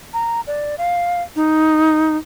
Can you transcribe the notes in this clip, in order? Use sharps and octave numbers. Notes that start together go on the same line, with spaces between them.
A#5
D5
F5
D#4